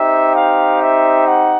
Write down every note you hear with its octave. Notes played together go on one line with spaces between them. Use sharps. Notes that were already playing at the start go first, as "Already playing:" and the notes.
Already playing: C4 D#4 G4 E5
F5
E5
F#5